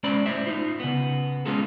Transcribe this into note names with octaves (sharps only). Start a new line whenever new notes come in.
G#3 C#4 C5 D5 B5
A2 C5 E5
D#4 F4
C#3 B3
G#3 C#4 F4 G#4 A4